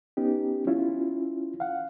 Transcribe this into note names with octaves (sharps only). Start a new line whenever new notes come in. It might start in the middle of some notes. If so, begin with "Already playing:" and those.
B3 C#4 D#4 G4
C#4 E4 F4
F5 F#5